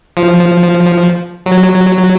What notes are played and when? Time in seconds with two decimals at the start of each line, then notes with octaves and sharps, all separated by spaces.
0.17 F3
1.46 F#3